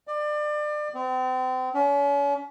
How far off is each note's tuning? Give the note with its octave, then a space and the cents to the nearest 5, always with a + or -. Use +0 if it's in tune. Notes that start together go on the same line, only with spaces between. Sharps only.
D5 +30
C4 -35
C#4 +40